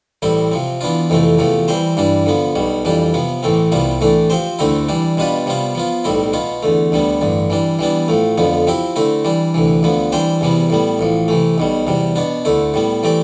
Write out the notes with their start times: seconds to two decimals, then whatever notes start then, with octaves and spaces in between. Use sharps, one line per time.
0.22 A1 A2 G3 C4 E4
0.52 C3 F3 C4
0.81 E3 B3 D4 F4
1.10 F2 C3 E3 A3 C4
1.39 E2 C3 F3 A3
1.68 E3 G3 C4 G4 C5
1.97 G2 E3 G3 D4
2.26 D3 F3 B3
2.56 B1 B2 G3
2.85 F2 E3 G3 D4 G4
3.14 C3 F3 B3
3.43 A1 A2 E3 A3 C4
3.72 C2 C3 G3 B3 F4
4.01 A2 E3 A3 D4
4.30 F3 C4 G4 C5
4.59 D2 D3 A3 C4 E4
4.89 E3 G3 D4
5.17 B2 G3 D4 F4 B4
5.46 C3 G3 B3 F4
5.75 F3 B3 F4
6.04 B1 A2 G3 C4 E4
6.33 B2 B3 F4
6.63 E2 D3 A3
6.92 D2 D3 G3 B3
7.21 A1 G2 D3
7.50 E3 G3 D4
7.79 E3 G3 B3 D4
8.08 A2 F3 A3
8.38 F2 D3 F3 B3
8.67 F3 C4 E4 G4
8.96 D3 A3 C4 E4
9.25 E3 G3 D4
9.54 D2 C3 E3
9.83 D2 D3 F3 B3
10.12 E3 G3 D4 G4 C5
10.41 E2 C3 E3 G3 B3
10.70 A2 G3 B3
10.99 A1 A2 F3
11.28 C3 E3 A3
11.58 B1 B2 G3
11.87 E2 C3 G3
12.16 B2 B3 D4
12.45 D2 D3 A3 E4
12.74 A2 G3 B3
13.03 E3 A3 C4 G4 D5